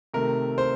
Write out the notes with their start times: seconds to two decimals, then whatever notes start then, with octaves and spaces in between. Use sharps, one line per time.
0.14 C3 D#3 A3 A#4
0.58 C5